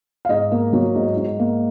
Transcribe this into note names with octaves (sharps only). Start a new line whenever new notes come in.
F5
G#2 D#5
A#3
F#3
G#2
G#2
A#3